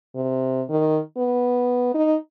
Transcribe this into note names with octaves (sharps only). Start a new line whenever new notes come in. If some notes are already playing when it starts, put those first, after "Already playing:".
C3
D#3
B3
D#4